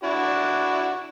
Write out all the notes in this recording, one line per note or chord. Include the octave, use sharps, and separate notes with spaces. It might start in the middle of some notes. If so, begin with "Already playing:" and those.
D4 E4 F#4